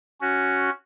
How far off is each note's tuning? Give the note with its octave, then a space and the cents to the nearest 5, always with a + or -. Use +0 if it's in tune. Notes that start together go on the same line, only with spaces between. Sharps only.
C#4 +0 F#4 +0